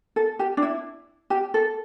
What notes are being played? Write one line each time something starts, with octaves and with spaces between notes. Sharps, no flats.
A4
G4
D4
E4
G4
A4